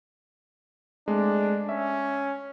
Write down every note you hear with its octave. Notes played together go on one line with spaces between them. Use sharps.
G#3 A3 C4 D4
C#4 E5